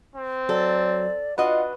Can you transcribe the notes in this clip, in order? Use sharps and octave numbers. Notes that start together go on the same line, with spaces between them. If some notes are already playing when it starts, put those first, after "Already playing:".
C4
F#3 A4 D5
D4 F4 F#4 B4 D#5 F#5